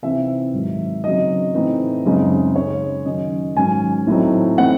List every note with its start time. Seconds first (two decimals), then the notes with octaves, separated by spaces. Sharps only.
0.02 C3 E3 C4 D#4 E5
0.54 G#2 D#3 F#3
1.04 C#3 F#3 C4 D#4 D#5
1.55 A2 E3 C4 D#4
2.06 F#2 C#3 G#3 C4 D#4
2.56 C#3 G#3 D#4 C#5
3.05 D#3 F#3 C#4 D#5
3.56 G#2 D#3 F#3 C#4 G#5
4.07 A2 F#3 C4 D#4
4.58 A2 E3 C4 D#4 F#5